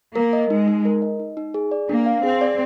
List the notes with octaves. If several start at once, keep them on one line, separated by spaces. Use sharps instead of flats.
A#3 A#4
D#5
G#3 D#4
D#4
A#4
D#5
D#4
D#4
G#4
D5
A#3 D4
F5
C4 G#4
D5